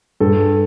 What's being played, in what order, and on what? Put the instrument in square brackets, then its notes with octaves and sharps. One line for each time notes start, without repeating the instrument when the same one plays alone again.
[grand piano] G2 A4